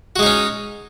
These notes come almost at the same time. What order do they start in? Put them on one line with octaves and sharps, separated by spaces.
F#4 G#3 D#4 C#4